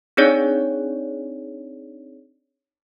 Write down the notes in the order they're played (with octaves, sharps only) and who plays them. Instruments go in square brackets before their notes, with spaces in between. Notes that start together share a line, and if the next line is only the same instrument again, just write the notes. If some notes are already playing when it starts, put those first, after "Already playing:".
[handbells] C4 D4 D#4 G#4 C#5 D5